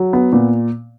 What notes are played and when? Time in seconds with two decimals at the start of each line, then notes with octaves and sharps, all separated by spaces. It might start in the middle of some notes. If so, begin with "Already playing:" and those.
Already playing: F#3
0.13 B3
0.33 A#2